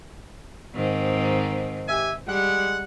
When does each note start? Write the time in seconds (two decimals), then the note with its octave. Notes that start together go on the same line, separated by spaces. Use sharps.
0.75 G#2 D#3 C4
1.88 G4 E5 G#5
2.27 G3 G#3 F#5